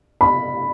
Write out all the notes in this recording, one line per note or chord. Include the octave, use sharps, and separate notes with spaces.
B5